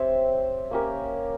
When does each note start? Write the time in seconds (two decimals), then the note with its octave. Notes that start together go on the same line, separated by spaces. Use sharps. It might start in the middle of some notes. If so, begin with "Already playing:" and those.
Already playing: C4 G4 C#5 E5
0.71 A#3 C#4 G4 A#4